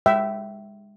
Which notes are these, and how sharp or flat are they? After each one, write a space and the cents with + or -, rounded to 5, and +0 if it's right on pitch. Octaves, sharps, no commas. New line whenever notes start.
G#3 -25 E5 +5 G5 -25